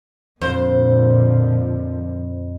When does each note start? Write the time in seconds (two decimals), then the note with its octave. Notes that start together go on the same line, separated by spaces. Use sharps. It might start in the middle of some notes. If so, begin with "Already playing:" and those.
0.42 F2 A#2 D3 F3 C5